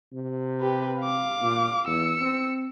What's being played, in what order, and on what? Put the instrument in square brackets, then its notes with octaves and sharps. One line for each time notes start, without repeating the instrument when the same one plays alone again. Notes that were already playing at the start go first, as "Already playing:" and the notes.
[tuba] C3
[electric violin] G4 B4
F5 D6
[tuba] A#2
[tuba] E2 [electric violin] E6 C#7
[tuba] C4